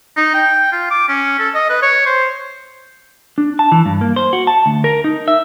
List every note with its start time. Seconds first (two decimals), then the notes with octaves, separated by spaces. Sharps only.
0.17 D#4
0.34 G5
0.72 F4
0.91 D6
1.08 C#4
1.39 A4
1.55 D#5
1.70 B4
1.82 C#5
2.06 C5
3.38 D4
3.59 A5
3.72 E3
3.86 G2
4.01 A#3
4.16 C5
4.33 F#4
4.47 A5
4.66 D2
4.84 A#4
5.04 D#4
5.28 E5